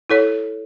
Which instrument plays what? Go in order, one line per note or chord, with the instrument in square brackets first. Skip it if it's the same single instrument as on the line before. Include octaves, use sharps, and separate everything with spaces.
[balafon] E4 A4 C#5